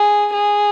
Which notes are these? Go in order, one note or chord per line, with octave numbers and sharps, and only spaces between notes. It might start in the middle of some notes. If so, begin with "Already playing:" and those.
Already playing: G#4
G#4